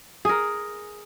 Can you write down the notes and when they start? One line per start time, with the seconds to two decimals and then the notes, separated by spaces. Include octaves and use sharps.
0.25 G#4 A#4